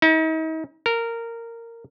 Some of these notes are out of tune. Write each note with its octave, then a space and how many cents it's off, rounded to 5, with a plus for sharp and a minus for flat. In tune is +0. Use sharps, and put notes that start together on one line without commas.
D#4 +40
A#4 -15